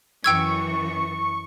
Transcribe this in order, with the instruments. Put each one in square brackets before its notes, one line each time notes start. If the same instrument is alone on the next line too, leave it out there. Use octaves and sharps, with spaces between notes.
[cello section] F#2 E3 [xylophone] G5 E6 G#6 [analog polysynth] C#6